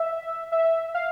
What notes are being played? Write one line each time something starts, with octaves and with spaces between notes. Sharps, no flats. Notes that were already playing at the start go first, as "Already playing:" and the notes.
Already playing: E5
E5
F5